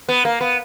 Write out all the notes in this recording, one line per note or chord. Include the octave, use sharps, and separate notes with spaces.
B3
A#3
B3